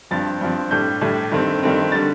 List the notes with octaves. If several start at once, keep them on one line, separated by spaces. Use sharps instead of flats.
G2 F3 C4 A6
G2 F3 C4
A2 G3 D4 G6
A2 G3 D4
G2 D#3 A3 C4
G2 D#3 A3 C4
D3 G3 A6